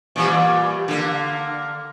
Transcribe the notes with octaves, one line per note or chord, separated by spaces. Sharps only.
A#2 E3 G3
D3 A#3